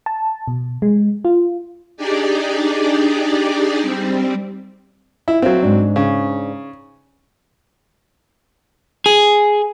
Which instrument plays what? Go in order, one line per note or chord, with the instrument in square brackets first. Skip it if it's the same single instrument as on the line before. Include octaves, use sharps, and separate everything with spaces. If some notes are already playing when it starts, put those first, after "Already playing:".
[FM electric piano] A5
B2
G#3
F4
[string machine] D4 D#4 G4 G#4 D5
G3 C4
[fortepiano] E4
[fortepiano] F#3 C4 [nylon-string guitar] A4 E5 F5
[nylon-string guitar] G#2 D4
[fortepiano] C#3
[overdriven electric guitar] G#4